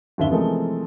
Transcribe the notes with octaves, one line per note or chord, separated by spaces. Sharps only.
F#1 D#2 D3 E5 G7
C3 E3 F3 G#3 A3 A#4